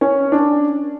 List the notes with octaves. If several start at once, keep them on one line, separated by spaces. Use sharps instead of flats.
C#4
D4